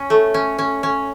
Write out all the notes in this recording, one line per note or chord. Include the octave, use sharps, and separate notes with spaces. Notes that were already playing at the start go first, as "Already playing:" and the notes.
Already playing: C#4
A3
C#4
C#4
C#4